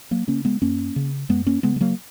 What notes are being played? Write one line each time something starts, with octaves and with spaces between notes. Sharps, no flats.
F#3 A#3
C#3 A#3 C#4
G#3 B3
F#2 A#3 C#4
C#3
F#2 G#3 B3
A#3 C#4
C#3 G#3 B3
G#3
F#3 A#3